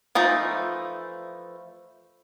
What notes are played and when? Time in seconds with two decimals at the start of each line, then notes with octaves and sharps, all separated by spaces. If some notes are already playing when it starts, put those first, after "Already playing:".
0.15 E3 F3 A3 D#4